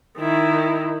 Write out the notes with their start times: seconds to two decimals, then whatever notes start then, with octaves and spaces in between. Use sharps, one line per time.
0.18 D#3 E4